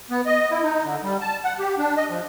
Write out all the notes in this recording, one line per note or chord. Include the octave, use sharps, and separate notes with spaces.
B3
D#5
E4
D#4
D3
G3
A5
F#5
G4
D4
D#5
F3